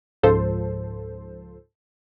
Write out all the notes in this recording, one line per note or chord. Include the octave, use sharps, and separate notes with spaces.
C#2 G#2 F3 A4 C5